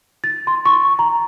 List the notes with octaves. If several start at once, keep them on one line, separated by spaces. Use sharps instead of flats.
A6
C6
C#6
A#5